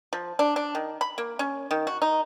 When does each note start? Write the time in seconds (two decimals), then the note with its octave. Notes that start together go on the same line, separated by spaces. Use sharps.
0.13 F3
0.39 D4
0.56 D4
0.75 D#3
1.01 B5
1.18 A#3
1.39 C#4
1.71 D#3
1.87 F#4
2.02 D#4